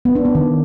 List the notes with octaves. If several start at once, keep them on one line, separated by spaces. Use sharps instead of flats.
B3
D4
B3
D#3